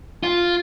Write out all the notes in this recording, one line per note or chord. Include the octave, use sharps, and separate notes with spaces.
F4